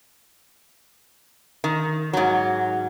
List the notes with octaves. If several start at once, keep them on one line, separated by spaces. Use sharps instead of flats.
D#3
G#2 F#3